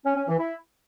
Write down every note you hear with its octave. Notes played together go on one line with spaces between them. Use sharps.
C#4
C#4
E3
E4